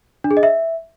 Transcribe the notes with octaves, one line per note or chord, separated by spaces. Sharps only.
D4
G#4
D#5
E5